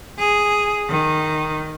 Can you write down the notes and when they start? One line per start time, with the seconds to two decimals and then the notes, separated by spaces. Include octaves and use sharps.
0.19 G#4
0.89 D#3